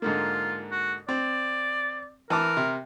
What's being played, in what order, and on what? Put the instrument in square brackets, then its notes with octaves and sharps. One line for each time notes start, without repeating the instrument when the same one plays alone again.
[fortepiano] G#2 D3 A#3 [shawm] F4
[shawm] F#4
[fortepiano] C4 [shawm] D5
[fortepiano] E3 A5 D6 [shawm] A#4
[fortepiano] C3